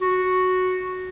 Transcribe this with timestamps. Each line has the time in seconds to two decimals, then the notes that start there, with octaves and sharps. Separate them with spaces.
0.01 F#4